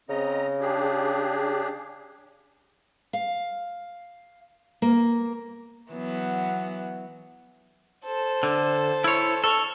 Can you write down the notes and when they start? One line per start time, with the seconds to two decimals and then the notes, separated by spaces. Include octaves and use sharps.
0.09 C#3 C4 D#5 A#5
0.60 D4 G4 G#4
3.13 F5
4.82 A#3
5.92 E3 F#3 B3
8.06 A4 C5
8.43 D3
9.04 E4 C#5
9.44 A4 C#6 F6